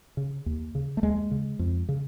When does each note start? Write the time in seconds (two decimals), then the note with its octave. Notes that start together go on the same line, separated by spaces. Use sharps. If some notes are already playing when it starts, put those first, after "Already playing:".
0.17 C#3
0.46 D#2
0.75 C#3
0.97 A3
1.03 D#2 G#3
1.31 C#3
1.59 F2
1.89 C#3